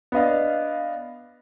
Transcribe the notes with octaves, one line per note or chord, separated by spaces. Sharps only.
B3 D4 D#5 F5